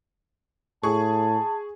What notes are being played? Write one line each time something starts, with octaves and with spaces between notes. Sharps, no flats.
A2 G#4 A5 C#6